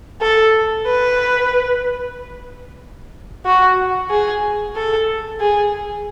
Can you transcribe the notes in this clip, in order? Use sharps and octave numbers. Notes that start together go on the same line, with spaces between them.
A4
B4
F#4
G#4
A4
G#4